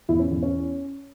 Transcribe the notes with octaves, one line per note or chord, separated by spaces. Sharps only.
E2 E4
C#4
E2
C#4